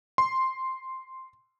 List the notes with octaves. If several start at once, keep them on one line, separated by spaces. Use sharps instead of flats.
C6